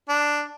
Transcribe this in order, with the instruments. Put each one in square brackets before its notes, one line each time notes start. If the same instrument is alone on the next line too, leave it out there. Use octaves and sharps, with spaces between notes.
[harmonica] D4